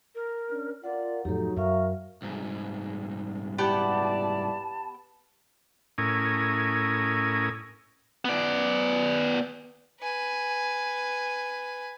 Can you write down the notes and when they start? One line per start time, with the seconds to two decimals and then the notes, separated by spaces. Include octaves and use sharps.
0.15 A#4
0.49 C#4 D4
0.84 F4 A#4 D5 F#5
1.25 F2 A2 F#3 D#4 G4 A4
1.57 F#2 A#4 E5 F5 C#6
2.22 C2 G#2
3.58 B3 E4 G4 D5 F#5 A5
5.98 A2 C#4 E4 A#4 G#5 D#6
8.25 B3 D5
10.00 B4 G#5